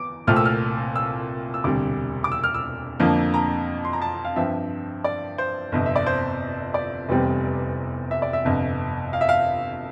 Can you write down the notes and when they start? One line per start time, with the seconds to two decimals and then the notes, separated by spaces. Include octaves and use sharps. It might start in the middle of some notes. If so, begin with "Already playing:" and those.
Already playing: E2 D6
0.27 C2 A#2 A3 C4 F6
0.36 E6
0.45 F6
0.96 E6
1.54 E6
1.64 E1 D2 C3 G3 D6
2.24 D6
2.32 E6
2.44 F6
2.54 E6
3.00 F2 D3 F3 A#3
3.34 A#5
3.85 C6
3.93 A#5
4.02 A5
4.25 F5
4.36 G2 F3 C4 E5
5.04 D5
5.38 C5
5.72 G1 F2 C3
5.86 E5
5.96 D5
6.06 C5
6.74 D5
7.09 F1 E2 C3 G3 C4
8.11 E5
8.22 D5
8.33 E5
8.45 G1 F2 C3
9.13 F5
9.21 E5
9.29 F5